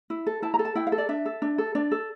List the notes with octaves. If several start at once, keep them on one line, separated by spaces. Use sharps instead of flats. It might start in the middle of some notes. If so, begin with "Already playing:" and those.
E4
A4
E4 A5
A#5
A4
A5
E4 G5
F5
A4
D5
D4 E5
A4
D4
A4
D4 D5
A4